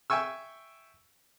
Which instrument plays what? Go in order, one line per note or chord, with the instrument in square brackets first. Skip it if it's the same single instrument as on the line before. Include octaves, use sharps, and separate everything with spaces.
[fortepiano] E5 G5 G#5 C#6 E6